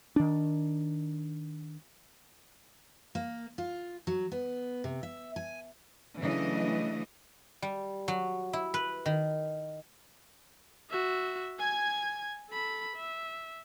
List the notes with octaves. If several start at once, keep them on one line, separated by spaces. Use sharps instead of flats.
D#3 D4
A#3
F4
F#3
B3
C3
E5
G#5
C#3 E3 F#3 A3 D4 D#5
G3
F#3
E4
B4
D#3
F#4 E5
G#5 G#6
A4 B5
E5